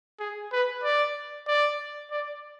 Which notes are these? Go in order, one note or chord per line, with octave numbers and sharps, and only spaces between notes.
G#4
B4
D5
D5
D5